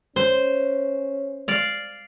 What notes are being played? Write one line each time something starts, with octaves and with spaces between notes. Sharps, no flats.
C#4 C5
D5 F5